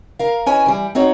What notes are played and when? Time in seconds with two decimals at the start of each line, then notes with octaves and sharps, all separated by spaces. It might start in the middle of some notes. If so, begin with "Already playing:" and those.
0.19 A#4 F5
0.46 C#4 E4 B4 C#5 D#5 G#5
0.66 E3 G3
0.95 C4 D#4 F#4 C#5 D#5